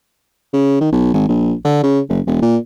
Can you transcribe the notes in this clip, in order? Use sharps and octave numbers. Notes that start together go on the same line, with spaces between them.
C#3
D#3
B1
G#1
A#1
D3
C#3
F#1
E1
A#2